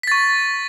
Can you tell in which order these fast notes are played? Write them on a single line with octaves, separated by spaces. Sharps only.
B6 A6 C#6